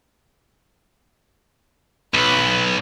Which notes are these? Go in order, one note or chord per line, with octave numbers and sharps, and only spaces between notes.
B1 B4